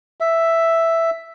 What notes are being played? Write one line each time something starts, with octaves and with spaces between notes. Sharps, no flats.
E5